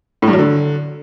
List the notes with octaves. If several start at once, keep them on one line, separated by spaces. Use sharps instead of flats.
A2
G2
F#3
D3